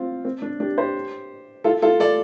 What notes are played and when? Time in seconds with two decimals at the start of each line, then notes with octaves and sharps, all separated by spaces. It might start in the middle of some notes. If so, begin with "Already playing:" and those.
Already playing: C4 F4
0.25 C4
0.42 D4
0.60 D4 G4
0.78 G4 C5
1.64 F4 A4
1.82 F4 A4
2.00 A4 D5